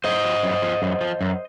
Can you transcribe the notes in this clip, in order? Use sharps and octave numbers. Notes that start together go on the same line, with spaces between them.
F#2 C5 D#5
F3
F#2
F3
F#2
F3
F#2